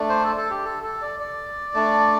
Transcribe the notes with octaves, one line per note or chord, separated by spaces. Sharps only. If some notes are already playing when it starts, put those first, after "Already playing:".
Already playing: A3 D4
C5
A4
A4
G4
A4
A4
D5
D5
A3 D4